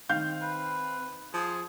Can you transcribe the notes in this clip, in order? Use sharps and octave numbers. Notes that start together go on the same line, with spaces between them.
D#3 C4 F5 G6
B4
F3 G#4